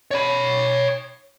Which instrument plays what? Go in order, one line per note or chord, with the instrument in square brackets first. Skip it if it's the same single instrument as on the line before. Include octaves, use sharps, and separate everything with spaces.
[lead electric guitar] C#5 B5